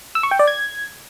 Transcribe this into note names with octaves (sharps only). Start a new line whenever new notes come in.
E6
C#6
G5
D5
G#6